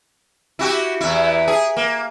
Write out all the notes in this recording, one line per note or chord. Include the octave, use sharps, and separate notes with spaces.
E4 F#4 G4
E2 E4
G#4
A#3